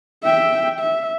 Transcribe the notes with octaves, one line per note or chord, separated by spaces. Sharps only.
E5 G5
E5